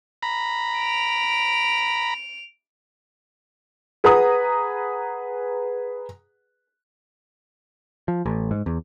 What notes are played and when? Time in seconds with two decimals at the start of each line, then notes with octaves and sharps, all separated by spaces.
0.23 A#5 B5
0.76 D7 F7
4.04 G#4 B4 F#5 A#5 D#6
8.08 F3
8.26 A1
8.51 G#2
8.66 E2